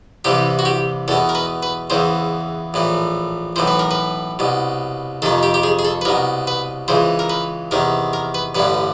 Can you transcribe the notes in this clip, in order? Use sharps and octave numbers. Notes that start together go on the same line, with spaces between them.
C2 C3 E3 G4
F#4
G4
E2 B2 A4
A#4
B4
B4
E2 C#3 E3 C5
A#1 A2 E3
B1 A2 E3 C5
B4
A#4
B4
C2 B2
F2 C3 D#3 A4
G4
G4
G#4
G#4
A4
B4
C2 B2 A#4
B4
C#2 C#3 E3 C5
A#4
B4
E2 C3 D#3 A#4
A#4
B4
A1 G2 D3 B4